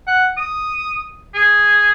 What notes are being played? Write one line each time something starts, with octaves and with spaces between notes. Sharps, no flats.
F#5
D#6
G#4